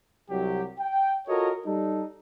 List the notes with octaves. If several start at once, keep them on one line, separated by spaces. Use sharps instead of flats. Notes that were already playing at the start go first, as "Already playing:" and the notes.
C2 F#3 G4
G5
F4 F#4 A4 A#4 C#5 D#5
G3 D#4 A4